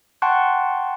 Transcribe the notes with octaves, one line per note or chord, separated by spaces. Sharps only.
F#5 G5 A5 C6 C#6 F#6